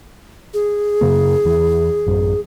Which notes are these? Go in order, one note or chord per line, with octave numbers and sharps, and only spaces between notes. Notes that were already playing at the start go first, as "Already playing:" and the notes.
G#4
F#2 C#3 A#3
E2 E3
A1 F#2